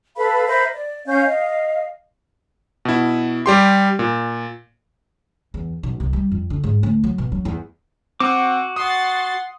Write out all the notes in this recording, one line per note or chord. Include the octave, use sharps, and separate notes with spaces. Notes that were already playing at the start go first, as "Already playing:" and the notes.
A4 B4 F5 B5
A#4 C5 E5 B5
D5
C#4 F5 G6
D#5 F5
B2 E4
G3 G4 C6
A#2
E2
B1
C2
G3
F2
D3
G#2
D2
F#3
B2
F#3
E2
C4 F#4 F#5 D6
F#5 C6 D#6 A6